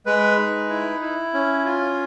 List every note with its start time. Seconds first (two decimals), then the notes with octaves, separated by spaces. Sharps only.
0.06 G#3 B4
0.38 D#4
0.70 E4
1.02 E4
1.34 C#4
1.65 F4